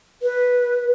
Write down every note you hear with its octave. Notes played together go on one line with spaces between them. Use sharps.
B4